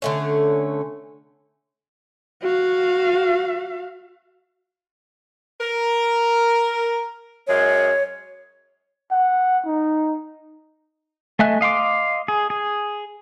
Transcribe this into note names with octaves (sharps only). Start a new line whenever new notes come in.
D3 A3 C#4
F#4 F5
A#4
F#2 G#3 G#4 C#5
F#5
D#4
A3 D#5 E5 G#5 F#6
D#5 F5 C6 D6
G#4
G#4